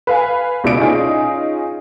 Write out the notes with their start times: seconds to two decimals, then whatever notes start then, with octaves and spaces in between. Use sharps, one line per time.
0.07 B4 F5 G#5
0.64 C#2 B2 E4 D5 D7
0.81 C#4 D#4 F4 G#4